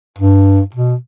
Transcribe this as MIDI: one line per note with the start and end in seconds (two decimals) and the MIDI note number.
0.19 0.61 43
0.75 0.95 47